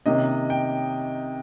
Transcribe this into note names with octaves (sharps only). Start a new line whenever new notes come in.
C3 D#3 A#3 C#4 D#5
G5